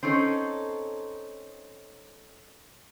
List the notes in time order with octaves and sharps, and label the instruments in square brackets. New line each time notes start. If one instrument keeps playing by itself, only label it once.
[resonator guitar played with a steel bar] C4 C#4 D#4 A4